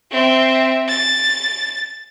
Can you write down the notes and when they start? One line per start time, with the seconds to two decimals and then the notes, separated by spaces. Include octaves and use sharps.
0.11 C4 E5
0.88 A6